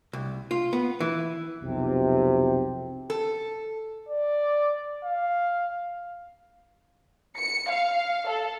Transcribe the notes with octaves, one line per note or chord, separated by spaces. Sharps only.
C2
F4
B3
E3
B1 F2 C3
A4
D5
F5
C#7
F5
A4